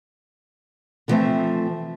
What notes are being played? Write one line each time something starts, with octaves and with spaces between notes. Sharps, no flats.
D3 E3 F3 A3 C4 E5